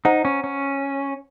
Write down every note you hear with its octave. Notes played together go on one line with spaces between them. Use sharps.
D#4 C5 F#5 A#5
C#4
C#4